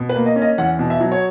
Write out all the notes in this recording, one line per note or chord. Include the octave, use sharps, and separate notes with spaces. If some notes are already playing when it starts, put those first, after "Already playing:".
Already playing: B2
B4
A#3
D#5
C#4
D#5
E2 F#5
B2
E5
F#3
C#5